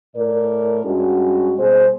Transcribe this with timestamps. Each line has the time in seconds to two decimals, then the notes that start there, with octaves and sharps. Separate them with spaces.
0.16 A2 A#4 D5
0.85 G2 G#3 C#4 F#4
1.58 B2 G3 G#4 C5